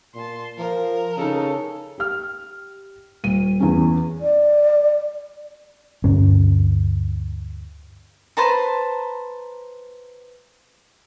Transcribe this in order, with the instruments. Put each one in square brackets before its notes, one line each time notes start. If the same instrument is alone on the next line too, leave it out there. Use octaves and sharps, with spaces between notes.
[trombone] A#2 [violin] A5 C6
[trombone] F3 [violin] A#4
[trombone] C#3 [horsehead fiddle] D#4 A4
[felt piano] G4 F6
D#1 D#7
E2 C#4
[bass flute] D5
[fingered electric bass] D2 G2 C#4
[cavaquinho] B4 C5 A5 A#5